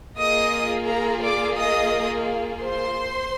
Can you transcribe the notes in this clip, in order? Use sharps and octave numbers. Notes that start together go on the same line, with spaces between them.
A#3 F4 G#4 D#5 D#6
A#4 A#5
D5 D6
D#5 D#6
C5 C6